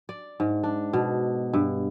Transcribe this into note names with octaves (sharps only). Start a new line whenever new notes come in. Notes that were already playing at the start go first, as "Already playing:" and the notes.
D5
G#2
D4
B2
G2